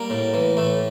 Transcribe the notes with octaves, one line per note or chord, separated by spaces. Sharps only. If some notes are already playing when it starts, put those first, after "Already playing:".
Already playing: G3 A#3
A2
E3
A2 A3